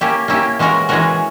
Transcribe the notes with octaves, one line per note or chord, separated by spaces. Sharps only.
A#3 C#4 E4 G4
A#3 C#4 E4 G4
E3 G#3 C#4 F#4 A#4
E3 G#3 C#4 F#4 A#4